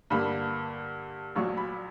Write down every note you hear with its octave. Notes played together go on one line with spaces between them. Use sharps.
G2 D3 A#3 B5
A#1 A#2 F#3 C#6
B5